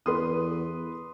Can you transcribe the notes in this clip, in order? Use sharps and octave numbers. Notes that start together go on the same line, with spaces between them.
E2 B4 C6 D#6